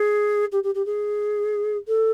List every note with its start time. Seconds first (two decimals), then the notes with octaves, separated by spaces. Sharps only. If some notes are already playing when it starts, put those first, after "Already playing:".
Already playing: G#4
0.52 G4
0.63 G4
0.75 G4
0.86 G#4
1.88 A4